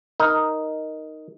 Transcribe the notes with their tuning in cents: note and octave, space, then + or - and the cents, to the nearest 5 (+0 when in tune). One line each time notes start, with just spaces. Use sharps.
D#4 +0 A#4 +0